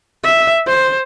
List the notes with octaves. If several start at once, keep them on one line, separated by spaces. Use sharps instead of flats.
E5
C5